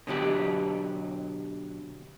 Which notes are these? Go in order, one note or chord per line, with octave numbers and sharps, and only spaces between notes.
B2 D3 F#3 G4